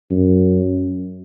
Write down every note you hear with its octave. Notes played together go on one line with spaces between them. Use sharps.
F#2